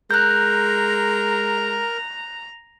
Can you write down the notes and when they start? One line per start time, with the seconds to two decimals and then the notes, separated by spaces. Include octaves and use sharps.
0.11 G#3 A#4 A#5 F#6 G6